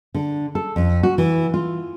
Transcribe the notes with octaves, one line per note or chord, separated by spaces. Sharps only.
D3
A4
F2
F#4
E3
F4